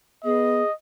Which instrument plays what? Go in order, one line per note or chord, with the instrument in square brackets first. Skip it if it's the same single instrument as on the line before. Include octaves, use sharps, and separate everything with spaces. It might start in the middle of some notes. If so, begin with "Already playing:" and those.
[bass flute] B3 [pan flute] G#4 [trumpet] D#5